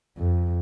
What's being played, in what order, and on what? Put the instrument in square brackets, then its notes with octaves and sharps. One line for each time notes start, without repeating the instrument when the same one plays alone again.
[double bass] F2